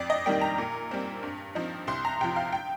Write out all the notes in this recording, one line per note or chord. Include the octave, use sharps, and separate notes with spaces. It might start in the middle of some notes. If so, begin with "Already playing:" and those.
Already playing: F2 D5
D#5
D#3 G3 A#3 G5
A#5
A#2
G3 C4
G2
F3 C4 D#4
C2 C6
A#5
C3 F3 G5
F5
G5